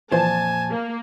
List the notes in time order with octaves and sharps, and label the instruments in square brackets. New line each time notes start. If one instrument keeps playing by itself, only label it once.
[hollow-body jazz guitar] F2 A#2 C5 [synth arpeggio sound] E3 F3 [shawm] G#5 [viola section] A5
[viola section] A#3